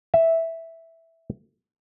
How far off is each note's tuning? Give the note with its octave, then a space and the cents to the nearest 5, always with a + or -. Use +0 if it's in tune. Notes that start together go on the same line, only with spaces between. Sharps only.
E5 -5